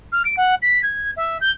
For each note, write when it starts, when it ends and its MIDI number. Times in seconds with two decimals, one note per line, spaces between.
0.12 0.23 89
0.25 0.34 98
0.37 0.55 78
0.62 0.80 95
0.83 1.11 92
1.17 1.38 76
1.41 1.50 91